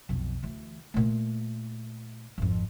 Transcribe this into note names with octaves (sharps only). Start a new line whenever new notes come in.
B1 F2
D2 E3
A#2 A3
G#1 F2